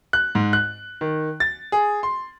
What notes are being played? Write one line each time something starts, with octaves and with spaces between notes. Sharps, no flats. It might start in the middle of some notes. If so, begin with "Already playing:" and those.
F#6
G#2
F#6
D#3
A6
G#4
C6